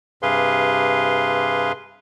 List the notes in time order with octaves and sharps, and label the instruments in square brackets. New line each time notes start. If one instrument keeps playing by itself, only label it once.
[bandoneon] G2 C3 G#4 B4 F5 C6